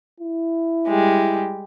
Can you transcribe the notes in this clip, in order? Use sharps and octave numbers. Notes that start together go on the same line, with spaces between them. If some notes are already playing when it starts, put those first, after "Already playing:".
E4
G3 G#3 G4